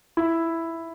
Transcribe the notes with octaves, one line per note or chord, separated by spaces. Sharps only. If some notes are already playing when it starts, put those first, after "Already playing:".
E4